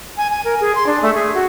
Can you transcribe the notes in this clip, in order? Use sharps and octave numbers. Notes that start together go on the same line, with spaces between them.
G#5
G#5
A#4
G#4
C6
D4
A3
G#4
F#4